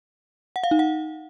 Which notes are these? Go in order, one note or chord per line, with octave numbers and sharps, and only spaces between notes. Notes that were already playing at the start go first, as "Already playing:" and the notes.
F#5
F5
D#4
F#5